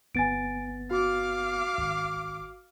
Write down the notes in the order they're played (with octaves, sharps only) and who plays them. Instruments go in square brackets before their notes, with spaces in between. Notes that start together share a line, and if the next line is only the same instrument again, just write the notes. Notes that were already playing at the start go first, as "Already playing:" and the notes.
[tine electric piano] G1 B3 A6 [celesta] G#5 D7
[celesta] F#4 [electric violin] F5 D6
[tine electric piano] G#1